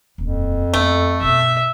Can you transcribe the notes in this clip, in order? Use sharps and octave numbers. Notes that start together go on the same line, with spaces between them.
D#1 F2
E2 A3 B3
B1 G2 E5